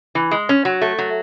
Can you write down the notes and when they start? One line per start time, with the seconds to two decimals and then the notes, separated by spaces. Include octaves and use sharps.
0.15 E3
0.31 G#3
0.49 C#4
0.65 F#3
0.82 A3
0.98 F#3